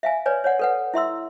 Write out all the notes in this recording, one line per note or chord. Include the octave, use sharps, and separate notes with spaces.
E5 F5 G#5
B4 C#5 D5 G#5
C#5 D5 F#5
A4 B4 F#5
E4 E5 C6 E6